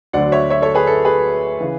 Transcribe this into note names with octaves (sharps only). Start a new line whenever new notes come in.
D2 D3 F#3 D5 F#5
C#5 E5
C#5 E5
A4 C#5
G#4 B4
A4
G#4 B4
C#3 E3